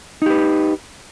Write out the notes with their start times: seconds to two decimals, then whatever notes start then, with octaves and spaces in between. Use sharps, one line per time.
0.22 D#4
0.26 G4
0.30 B4